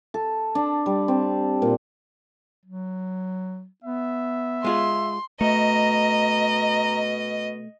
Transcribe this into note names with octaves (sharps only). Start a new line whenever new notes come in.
A4
D4
G3
C4
A#2
F#3
B3 E5
G#3 F4 G#4 C6
B2 A3 D#5 A#5